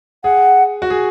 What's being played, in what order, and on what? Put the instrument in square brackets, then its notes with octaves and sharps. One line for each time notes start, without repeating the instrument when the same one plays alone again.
[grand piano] G#4 [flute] F#5
[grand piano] F#4
G#4